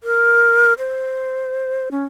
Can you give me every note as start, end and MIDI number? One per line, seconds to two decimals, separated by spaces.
0.03 0.73 70
0.78 1.89 72
1.91 2.04 61